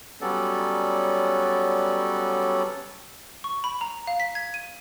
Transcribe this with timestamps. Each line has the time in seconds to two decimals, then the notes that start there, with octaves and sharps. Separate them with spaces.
0.21 F#3 G3 B3 C#4 A4 D5
3.44 C#6
3.64 B5
3.81 A#5
4.07 F5
4.20 B6
4.35 G#6
4.54 D#7